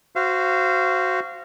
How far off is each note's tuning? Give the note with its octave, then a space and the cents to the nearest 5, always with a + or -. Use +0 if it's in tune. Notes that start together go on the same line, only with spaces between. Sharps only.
F#4 +0 C5 -5 F5 -25